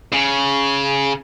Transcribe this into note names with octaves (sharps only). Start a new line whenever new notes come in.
C#3